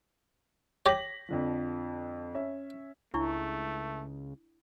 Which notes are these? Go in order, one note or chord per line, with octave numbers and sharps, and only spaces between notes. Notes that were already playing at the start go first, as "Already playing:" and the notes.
G4 C#5 A#6 B6 F#7
F2 D3 F3
C#4 E5
C#2 A3 D4 E4 C#6